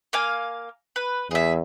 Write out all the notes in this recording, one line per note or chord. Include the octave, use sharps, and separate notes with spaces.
A#3 F5 G#5
B4
E2 G#4 E5